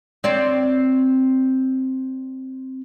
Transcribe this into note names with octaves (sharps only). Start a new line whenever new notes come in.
C4 C#5 D5